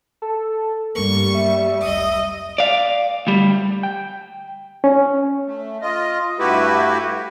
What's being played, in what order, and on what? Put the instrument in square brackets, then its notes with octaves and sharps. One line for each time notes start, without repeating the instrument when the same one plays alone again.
[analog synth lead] A4
[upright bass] G2 A3 [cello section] G3 [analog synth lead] A#3 [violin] C#6
[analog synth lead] E5
[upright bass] F1 C2 [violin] D#5 D#6
[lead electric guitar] D5 F5
D2 G3
[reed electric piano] G5
C#4
[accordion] A3
F4 D#5
G2 A3 E4 F#4 G4 B4